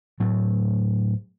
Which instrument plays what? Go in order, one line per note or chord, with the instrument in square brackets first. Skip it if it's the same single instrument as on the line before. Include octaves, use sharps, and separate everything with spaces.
[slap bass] A2 F#3 A3